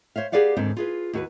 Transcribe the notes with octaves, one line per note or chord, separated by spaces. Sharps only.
C5 C#5 E5 F5
G4 G#4 B4 D5 F5 F#5
D#2 G#2 D3 C4 C5
F4 G#4 B4
D#2 F#4 B4